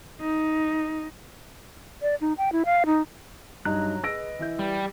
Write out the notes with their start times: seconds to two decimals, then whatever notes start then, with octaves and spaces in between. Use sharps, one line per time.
0.21 D#4
2.02 D5
2.21 D#4
2.38 G5
2.52 E4
2.66 F5
2.86 D#4
3.65 G2 F#3 D#4 A#5 F#6
4.04 G#4 B4 D#5 E6 A#6 D7
4.39 E3 E4 G6
4.59 G3